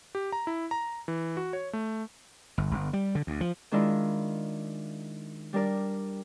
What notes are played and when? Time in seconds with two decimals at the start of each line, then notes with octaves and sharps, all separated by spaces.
0.15 G4
0.32 A#5
0.47 E4
0.71 A#5
1.08 E3
1.37 F#4
1.53 C#5
1.73 A3
2.58 G1
2.71 G1
2.93 G3
3.15 D3
3.27 D2
3.41 F3
3.71 D#3 G#3 D4 E4 F4 A#4
5.53 G3 D4 A#4 D5